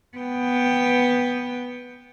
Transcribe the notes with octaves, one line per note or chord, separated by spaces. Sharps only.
B3 G5